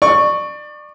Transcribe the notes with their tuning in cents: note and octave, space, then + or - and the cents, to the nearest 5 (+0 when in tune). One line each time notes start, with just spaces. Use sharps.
D5 +25 C#6 +0